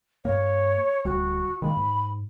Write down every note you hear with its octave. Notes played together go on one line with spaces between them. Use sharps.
G2 A#3 C#5
D1 D2 G3 F#4
D#3 G#3 A#3 B5
G#2